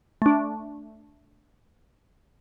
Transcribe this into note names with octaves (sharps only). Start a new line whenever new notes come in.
A3 D4